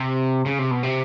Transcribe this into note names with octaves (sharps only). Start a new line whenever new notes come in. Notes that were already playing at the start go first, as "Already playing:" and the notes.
Already playing: C3
C#3
C3
B2
C3